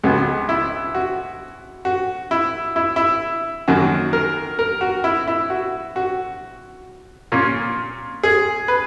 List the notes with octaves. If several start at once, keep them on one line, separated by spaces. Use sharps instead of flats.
C#2 C#3 G#3 B3 F#4
E4
F#4
F#4
E4
E4
E4
F#2 D#3 F#3 A#3 F#4
A#4
A#4
F#4
E4
E4
F#4
F#4
A#2 A#3 C#4
G#4
B4